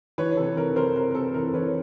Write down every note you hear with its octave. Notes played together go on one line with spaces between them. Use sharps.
E3 B4 C#5
C3 A4
E3 A#4
C3 A#4 C5
C3 A#4
A#4
C3 A4
E3 A#4
E3 B4 C#5